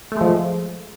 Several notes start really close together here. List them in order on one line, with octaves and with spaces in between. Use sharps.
A3 G#3 F3